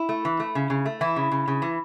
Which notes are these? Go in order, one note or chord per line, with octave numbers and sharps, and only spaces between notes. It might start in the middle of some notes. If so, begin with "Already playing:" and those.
Already playing: E4
A3
E3
A3
C#3
C#3
A3
E3 E4
C#3
C#3
C#3
E3